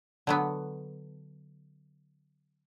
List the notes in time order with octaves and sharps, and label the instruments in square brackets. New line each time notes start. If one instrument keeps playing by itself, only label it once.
[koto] D3 F#3 B3